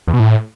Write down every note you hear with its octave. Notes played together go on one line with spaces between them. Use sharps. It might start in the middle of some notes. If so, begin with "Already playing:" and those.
E2
B2
A2